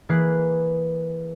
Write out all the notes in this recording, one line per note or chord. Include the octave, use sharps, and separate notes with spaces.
E3 A#3 G#4 B4 F#6 C7